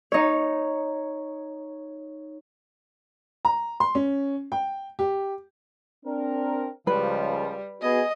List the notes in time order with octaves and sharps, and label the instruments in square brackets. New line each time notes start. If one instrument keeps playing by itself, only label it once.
[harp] D#4 C#5
[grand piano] A#5
C6
C#4
G5
G4
[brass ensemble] C4 D4 A#4
[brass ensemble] C#2 F3 [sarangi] G3 [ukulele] B4
[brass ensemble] B3 F#4 G#4 [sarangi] D#5